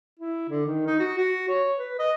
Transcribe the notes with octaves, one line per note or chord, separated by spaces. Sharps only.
E4
D3
D#3
D#4
F#4
F#4
C#5
B4
D#5